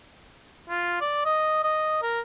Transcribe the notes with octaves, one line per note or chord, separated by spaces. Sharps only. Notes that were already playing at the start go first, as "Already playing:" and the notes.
F4
D5
D#5
D#5
A#4